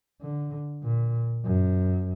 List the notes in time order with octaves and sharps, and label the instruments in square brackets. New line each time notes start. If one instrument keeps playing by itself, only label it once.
[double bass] D3
A#2
F#2